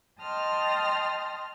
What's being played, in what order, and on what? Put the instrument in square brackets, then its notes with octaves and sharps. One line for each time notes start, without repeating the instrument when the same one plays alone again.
[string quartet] D#5 G5 A5 C6 D#6 F6